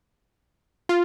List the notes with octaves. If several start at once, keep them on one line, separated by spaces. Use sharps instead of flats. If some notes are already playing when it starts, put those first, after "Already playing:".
F4